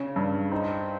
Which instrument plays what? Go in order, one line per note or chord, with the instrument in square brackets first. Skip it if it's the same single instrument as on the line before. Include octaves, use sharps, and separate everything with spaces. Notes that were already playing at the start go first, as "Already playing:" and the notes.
Already playing: [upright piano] C#3 C#4
G2
[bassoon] C4 [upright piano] D#4